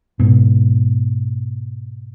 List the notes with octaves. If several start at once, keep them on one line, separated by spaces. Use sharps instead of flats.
G#2 B2